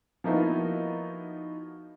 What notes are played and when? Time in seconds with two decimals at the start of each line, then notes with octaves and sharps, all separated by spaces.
0.24 F3 A#3 B3 D#4 E4 F#4